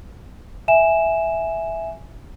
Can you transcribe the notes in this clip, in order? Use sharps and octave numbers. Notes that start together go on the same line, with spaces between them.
E5 G#5 E7